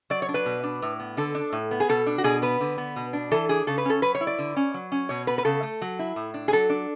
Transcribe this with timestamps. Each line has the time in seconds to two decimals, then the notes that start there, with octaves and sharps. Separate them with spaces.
0.10 F#3 D5
0.22 C#5
0.29 D4
0.34 B4
0.46 B2
0.63 D4
0.82 A2
0.99 B3
1.17 D3 A4
1.35 D4
1.52 A2
1.71 B3
1.80 G#4
1.89 B2 A4
2.07 D4
2.18 F#4
2.24 B2 G#4
2.42 B3 B4
2.61 D3
2.78 B3
2.96 B2
3.13 D4
3.31 E3 A4
3.49 D4 G#4
3.67 C#3 A4
3.78 B4
3.85 C#4 A4
4.02 F#3 B4
4.15 C#5
4.21 E4
4.27 D5
4.39 D3
4.56 C#4
4.74 F#3
4.92 C#4
5.09 B2 C#5
5.27 B3 B4
5.38 B4
5.45 C#3 A4
5.63 A3
5.82 F#3
5.99 E4
6.16 A2
6.34 D4
6.48 G#4
6.53 F#3 A4
6.69 D4